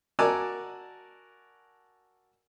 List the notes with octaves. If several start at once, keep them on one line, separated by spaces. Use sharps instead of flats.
F#4 A#4 D5 G#5 A5 E6